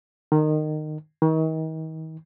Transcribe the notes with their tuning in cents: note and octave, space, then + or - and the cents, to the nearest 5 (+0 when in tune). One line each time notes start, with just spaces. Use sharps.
D#3 -20
D#3 +40